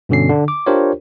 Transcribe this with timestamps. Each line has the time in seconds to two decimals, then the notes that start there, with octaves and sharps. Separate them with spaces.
0.09 G2 B2 D3 C#4 C7
0.29 D3 D4
0.48 D6
0.66 D4 F4 G4 A#4 C5 C#5